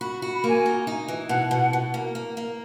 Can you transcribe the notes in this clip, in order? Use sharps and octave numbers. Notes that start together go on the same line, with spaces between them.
F#4 B5
B5
F#4
B5
A#3
G#5
D#4
D#4
E3
B2 F#5
B2
B2
A#3
A#3
A#3